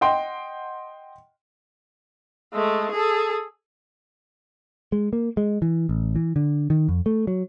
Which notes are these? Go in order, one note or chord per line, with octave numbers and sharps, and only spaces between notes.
D#5 F#5 G5 C6
G#3 A3
G#4 A4
G#3
A#3
G#3
E3
A1
E3
D3
D#3
F2
A3
F#3